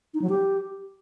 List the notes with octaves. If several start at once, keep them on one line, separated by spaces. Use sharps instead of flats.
D#4
F#3
G4